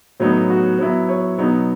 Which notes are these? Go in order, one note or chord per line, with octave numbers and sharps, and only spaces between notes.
A2 F#3 B3 D#4
F#4
F#3 B3 E4
C#5
B2 F#3 B3 D#4